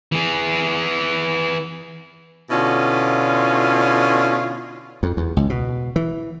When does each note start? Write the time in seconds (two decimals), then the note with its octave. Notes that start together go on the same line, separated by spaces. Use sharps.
0.12 E3 G#4
2.50 B2 D3 C#4 E4 F4
5.03 F2
5.17 E2
5.37 C#2
5.50 B2
5.96 E3